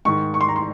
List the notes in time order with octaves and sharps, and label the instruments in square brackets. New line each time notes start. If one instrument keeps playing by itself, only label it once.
[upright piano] G#2 D#3 C#6
C#6
C6
A#5
C6